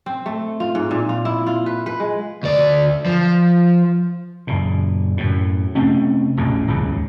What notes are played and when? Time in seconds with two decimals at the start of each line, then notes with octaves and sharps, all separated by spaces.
0.06 C4
0.26 A3
0.60 F4
0.75 G#2
0.91 A#2
1.09 F4
1.25 E4
1.46 F4
1.66 B4
1.86 B4
2.00 G#3
2.43 D2 D5
3.06 F3
4.47 F#1 A#2
5.17 F#2 A2
5.75 C3 A3 C4 C#4
6.37 E1 A1 A#2 C#3
6.67 D#1 C#2 G#2 C#3